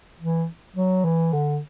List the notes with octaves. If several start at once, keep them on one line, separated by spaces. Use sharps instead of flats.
E3
F#3
E3
D3